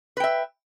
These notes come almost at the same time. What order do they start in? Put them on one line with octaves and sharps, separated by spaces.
B4 G5 E5